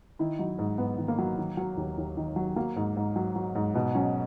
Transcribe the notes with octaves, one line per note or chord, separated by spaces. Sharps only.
D#3 E4
F#3 D#4
G#2
G#2 B3
D#3
A#3
F#3
D#3
F#3
D#2
D#2
D#3
F#3
F#3 A#3
G#2
G#2
F#3
F#3
G#2
B2 B3
F#3 C#4